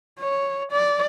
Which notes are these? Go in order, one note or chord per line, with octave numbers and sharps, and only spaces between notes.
C#5
D5